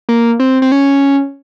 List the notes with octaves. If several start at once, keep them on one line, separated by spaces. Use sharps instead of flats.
A#3
C4
C4
C#4